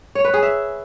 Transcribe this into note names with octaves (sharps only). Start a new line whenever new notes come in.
C#5
B4
G#4
E5